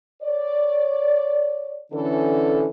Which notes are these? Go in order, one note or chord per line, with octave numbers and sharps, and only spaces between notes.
C#5 D5
D3 E3 C#4 A4